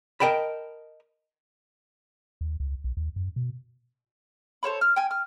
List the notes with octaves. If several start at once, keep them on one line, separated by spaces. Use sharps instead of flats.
A#4 D#5 G5 A5 B5
D#2
C#2
B1
D#2
F#2
B2
A4 C5 C#5 B5
F6
G5 G#5
F6